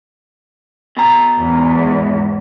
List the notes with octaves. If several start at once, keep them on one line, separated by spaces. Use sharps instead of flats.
B2 A#5
E2 G#2